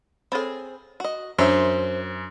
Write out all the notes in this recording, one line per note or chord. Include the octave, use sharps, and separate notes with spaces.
C4 G#4 A4 C#5 B5
F#4 D#5
F#2 D4 C5 C#5 E5